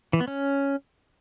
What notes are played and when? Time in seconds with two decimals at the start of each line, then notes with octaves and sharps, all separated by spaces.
0.13 E3
0.20 B3
0.28 C#4